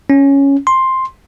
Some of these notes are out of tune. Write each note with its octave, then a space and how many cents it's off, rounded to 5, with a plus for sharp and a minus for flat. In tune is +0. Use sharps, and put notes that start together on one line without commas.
C#4 +0
C6 +5